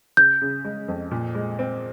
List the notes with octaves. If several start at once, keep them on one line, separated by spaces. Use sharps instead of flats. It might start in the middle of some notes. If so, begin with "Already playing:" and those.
C#3 G6
C#3
G#3
F2
A#2
G#3
C4